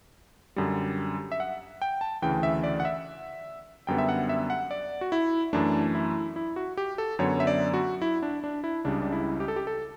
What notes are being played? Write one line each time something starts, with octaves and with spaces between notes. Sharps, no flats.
F#2 D3 G3
E5
F#5
G5
A5
D2 C#3 E3 G5
E5
D5
F#5
E5
F#2 D3 G3 B3 G5
E5
F#5
E5
F#5
D5
F#4
E4
F#2 E3 A3 D4
E4
E4
F#4
G4
A4
F#2 D3 F#3 B3 C#5
E5
D5
F#4
E4
D4
D4
E4
C#2 C#3 G3 D4
D4
E4
G4
A4
G4
A4